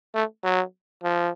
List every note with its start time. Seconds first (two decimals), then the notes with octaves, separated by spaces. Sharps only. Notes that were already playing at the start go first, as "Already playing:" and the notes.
0.15 A3
0.44 F#3
1.03 F3